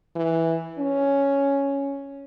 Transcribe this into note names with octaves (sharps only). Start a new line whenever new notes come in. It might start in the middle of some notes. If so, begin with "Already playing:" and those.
E3
C#4